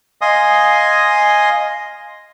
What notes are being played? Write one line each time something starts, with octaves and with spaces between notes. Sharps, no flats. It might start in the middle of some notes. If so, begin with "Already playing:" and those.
D#5 F5 G#5 C6 D#6